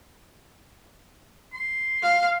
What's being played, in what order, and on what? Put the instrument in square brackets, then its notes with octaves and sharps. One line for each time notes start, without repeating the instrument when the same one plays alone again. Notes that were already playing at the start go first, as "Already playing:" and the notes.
[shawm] C6
[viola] F5